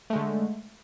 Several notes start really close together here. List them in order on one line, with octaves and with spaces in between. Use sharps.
A3 G#3 D3